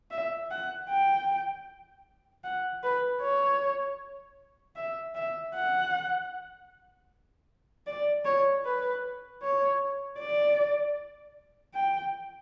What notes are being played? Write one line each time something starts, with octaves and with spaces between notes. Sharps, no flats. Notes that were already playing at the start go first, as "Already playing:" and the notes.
E5
F#5
G5
F#5
B4
C#5
E5
E5
F#5
D5
C#5
B4
C#5
D5
G5